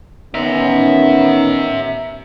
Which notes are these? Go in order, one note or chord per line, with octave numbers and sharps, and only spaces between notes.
D#3 B3 C#4 E5 A#5